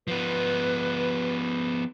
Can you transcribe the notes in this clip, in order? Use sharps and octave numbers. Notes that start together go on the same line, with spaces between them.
F3 B3 B4